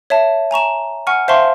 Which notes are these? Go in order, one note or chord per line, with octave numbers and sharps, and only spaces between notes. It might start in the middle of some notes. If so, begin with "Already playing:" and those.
C#5 E5 A5
G#5 A#5 C#6 E7
F#5 G#5 C#6 F6
C5 E5 F5 A5 C6 C#6